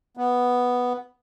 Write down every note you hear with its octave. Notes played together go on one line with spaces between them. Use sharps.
B3